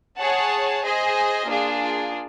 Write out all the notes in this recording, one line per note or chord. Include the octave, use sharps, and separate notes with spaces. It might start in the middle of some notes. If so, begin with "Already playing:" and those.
G#4 C#5 F#5 A5
G#4 C5 D#5 G#5
A#3 D4 F4 G#4